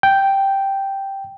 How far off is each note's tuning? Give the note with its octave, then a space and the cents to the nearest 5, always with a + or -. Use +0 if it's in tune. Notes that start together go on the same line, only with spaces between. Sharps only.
G5 +0